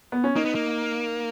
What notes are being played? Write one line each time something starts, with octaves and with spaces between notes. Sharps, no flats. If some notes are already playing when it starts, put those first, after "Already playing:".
B3
C#4
A#3 D#4
B3
A#3